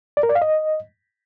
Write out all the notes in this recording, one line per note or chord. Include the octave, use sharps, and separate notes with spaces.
D5
A#4
D5
F5
D#5